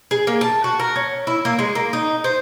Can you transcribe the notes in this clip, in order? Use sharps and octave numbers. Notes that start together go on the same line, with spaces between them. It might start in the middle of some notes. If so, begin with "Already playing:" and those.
G#4
A#3
A5
F#4
A#4
C#4
E4
A#3
G#3
A#3
D#4
C5